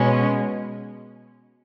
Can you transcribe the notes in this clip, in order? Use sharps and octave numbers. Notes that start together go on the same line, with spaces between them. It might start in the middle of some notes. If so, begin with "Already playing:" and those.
Already playing: B2 G#3 C#4